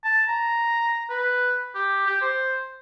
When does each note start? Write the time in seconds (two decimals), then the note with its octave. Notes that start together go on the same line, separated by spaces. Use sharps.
0.04 A5
0.28 A#5
1.10 B4
1.75 G4
2.07 G4
2.21 C5